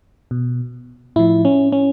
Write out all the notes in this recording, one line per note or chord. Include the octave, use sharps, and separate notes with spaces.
B2
A2 F3 E4
C#4
C#4